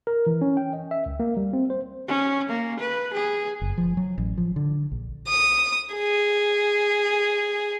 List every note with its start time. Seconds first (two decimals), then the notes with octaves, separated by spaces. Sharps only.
0.07 A#4
0.27 E3
0.41 C#4
0.57 G5
0.73 D#5
0.91 E5
1.06 C#2
1.20 A#3
1.37 G3
1.53 C4
1.70 C5
2.08 C#4
2.49 A#3
2.80 B4
3.14 G#4
3.62 F#1
3.78 F3
3.97 F#3
4.18 A1
4.38 F3
4.56 D3
4.92 A#1
5.28 D#6
5.94 G#4